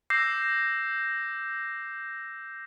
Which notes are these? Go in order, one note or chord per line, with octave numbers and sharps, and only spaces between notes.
D6 E6 G6 A#6 C7